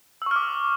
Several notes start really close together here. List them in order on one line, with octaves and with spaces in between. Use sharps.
E6 C#6 F6 D6